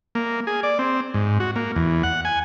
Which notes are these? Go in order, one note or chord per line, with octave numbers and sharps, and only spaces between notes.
A#3
G#4
D5
C4
G#2
F#4
A#3
E2
F#5
G#5